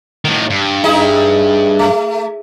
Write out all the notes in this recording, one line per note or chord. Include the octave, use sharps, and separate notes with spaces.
A2 D#3
G2
D#4 E4 G#4
A3